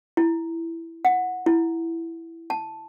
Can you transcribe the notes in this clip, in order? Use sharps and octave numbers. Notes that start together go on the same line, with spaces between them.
E4
F#5
E4
A5